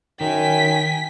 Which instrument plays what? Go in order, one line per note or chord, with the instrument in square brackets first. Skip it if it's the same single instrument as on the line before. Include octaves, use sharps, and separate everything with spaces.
[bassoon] F#2 [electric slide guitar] D#3 [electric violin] G5 G#5 [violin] B6